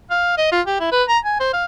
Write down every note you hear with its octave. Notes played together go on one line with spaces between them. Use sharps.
F5
D#5
F4
G4
E4
B4
A#5
G#5
C5
F5